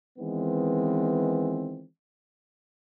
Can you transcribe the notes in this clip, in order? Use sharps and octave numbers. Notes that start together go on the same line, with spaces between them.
D#3 E3 G#3 B3 C4